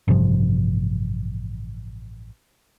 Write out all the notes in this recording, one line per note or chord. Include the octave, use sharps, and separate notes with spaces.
A1 G2 C3 F3